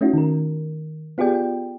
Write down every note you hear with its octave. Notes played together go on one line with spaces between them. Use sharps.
A3 C#4 D#4 E4 F#4
D#3 A#4
B3 F4 G4 G#4 D5 G5